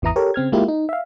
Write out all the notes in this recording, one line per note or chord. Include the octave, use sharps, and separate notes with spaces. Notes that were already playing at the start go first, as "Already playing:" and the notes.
G#1 E2 E3 E4 A#5 D#6
G4 A4 A#4 C#5
C#3 C4 F6 G#6
G#3 A#3 E4 F4 G4
D#4
E5 F5